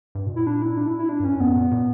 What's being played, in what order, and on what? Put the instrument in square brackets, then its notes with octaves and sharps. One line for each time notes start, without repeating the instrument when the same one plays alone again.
[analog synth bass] G2
B2
A#2
[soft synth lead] E4
D4
E4
D4
E4
E4
D4
[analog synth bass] G2
[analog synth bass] F#2 [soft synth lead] C#4
[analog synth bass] F#2 [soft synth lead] B3
[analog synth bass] A#2
A#2